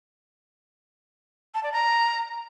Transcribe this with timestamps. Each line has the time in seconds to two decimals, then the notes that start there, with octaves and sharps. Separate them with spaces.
1.54 A5
1.63 D5
1.72 A#5